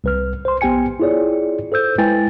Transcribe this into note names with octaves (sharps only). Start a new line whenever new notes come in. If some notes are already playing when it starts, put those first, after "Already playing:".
C2 B4 F6
C5 C6
A#1 B3 G4 G5 G#5 C#7
E4 F4 G#4 C#5 D5
A4 C5 E6 G6
G#3 E4 B4 G5 G#5 A6